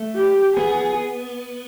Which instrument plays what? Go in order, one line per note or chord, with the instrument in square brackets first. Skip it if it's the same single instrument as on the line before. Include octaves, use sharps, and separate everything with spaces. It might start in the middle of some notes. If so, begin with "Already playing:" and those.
Already playing: [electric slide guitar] A3
[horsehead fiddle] G4
[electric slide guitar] B3 [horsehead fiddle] G#4